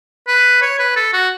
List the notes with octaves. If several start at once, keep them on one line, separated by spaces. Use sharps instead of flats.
B4
C#5
B4
A4
F#4